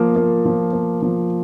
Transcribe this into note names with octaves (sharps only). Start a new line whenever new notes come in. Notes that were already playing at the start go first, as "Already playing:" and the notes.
Already playing: F3 A#3
A#3
F3
A#3
F3